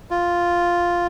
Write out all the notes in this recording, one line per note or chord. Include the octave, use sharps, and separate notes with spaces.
F4